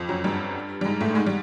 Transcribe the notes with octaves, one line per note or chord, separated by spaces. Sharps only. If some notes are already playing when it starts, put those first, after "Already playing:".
Already playing: F2 F3
F#2 F#3
G2 G3
G3
G#2 G#3
A2 A3
G#2 G#3
G3